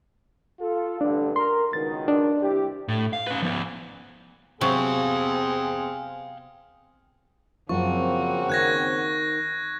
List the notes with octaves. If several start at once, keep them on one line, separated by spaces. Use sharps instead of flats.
F4 A4
A1 G2 D3 D4
A#4 C6
C#2 B2 D#3 A6
D4
C2 E4 G4
A2
F5
C#4 B4
F3 B3
C3 F#3 B3 C4 G#4 F5 G5
F#2 C#3 F3 A#3 C4 F4 F#4 C#6
D#3 F#6 G#6 A#6